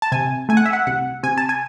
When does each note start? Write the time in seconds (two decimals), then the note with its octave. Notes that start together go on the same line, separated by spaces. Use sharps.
0.02 A5
0.12 C3 G#5
0.49 A3 G#5
0.57 F#5
0.66 E5
0.73 F#5
0.87 C2 F#5
1.23 C3 G#5
1.38 A5
1.49 G#5